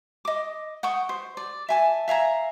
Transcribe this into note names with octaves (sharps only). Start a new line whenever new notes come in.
D#5 D6
F#5 G5 C#6 D#6
C5
D5
E5 G#5 A5
E5 F5 G#5 A#5